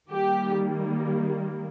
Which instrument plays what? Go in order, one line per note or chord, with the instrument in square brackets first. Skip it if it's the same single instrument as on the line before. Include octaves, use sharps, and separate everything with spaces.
[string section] D#3 G3 A#3 G4